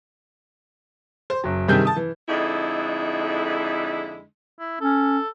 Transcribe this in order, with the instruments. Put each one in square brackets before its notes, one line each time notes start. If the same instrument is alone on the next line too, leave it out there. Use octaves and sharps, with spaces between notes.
[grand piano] C5
F#1 F#3
G2 C3 D#3 G3 G#4 G6
A5 D#6
E3
[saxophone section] F2 D3 G#3 D#4 E4
[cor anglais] E4
[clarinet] C#4 [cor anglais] A4